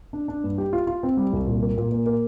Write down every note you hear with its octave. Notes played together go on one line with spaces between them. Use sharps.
D4
D4
G2
G4
F4
F4
C4
G3
C2
A#2
A#3
A#2
A#3
A#3